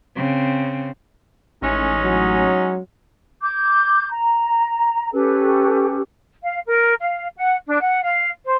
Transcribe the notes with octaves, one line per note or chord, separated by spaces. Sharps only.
C#3 C4
A1 G#3 C#4 D#4
F#3
D6 G6
A#5
C#4 G4 A4 B4
F5
A#4
F5
F#5
D4
F#5
F5
C5